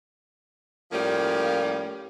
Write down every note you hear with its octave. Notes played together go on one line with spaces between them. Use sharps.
A2 F3 G3 A#3 C#4 F4